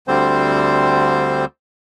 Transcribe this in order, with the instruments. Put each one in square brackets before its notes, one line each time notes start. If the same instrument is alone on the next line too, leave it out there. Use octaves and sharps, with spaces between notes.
[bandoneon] D2 D3 G3 C4 C5